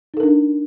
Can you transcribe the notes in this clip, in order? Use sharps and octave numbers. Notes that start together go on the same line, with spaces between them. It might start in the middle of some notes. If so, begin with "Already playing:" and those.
D4 D#4 A4 A#4